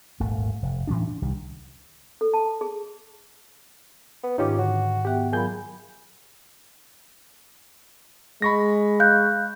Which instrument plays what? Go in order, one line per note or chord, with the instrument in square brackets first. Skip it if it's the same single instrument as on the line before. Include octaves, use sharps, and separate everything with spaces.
[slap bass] D#1 G#1 A3
F1
A2 E3 C#4 D4
D4
C2 D#3 G3
[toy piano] A4
A5
G#4
[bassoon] B3
[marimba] G#2 D#3 D6 [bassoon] C#4 [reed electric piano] D#4 F4 G4
[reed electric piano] D3 [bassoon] F#4
[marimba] B3 E5 G5 [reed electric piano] G4 F#5
[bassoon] A#2 [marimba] F#3 B5 [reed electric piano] G#4 G#5 G6
[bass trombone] G#3 [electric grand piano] B5 C#6 A#6
[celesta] F5 F#6 G6